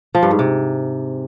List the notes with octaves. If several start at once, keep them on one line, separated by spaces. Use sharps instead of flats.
F3
G2
G#2
C3